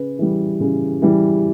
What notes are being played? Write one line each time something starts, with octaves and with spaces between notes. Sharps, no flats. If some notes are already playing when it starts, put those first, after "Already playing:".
Already playing: C#3 B4
E3 G3
C#3
E3 G3